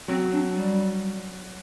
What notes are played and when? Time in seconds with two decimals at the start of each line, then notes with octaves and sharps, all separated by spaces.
0.08 F#3 C4
0.32 D4
0.55 G3